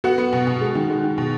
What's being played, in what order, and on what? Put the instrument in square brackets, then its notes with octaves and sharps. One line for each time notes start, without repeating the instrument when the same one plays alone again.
[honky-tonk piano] B3 F#4 F#5
B3
B2
B2
G#3
D#3
G#3
D#3
B2